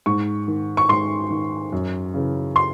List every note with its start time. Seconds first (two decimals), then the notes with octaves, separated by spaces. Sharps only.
0.06 G#2 C#6
0.48 D#3
0.77 C#6
0.89 G#2 C6
1.31 D#3
1.72 F#2
2.14 C#3 E3
2.56 C6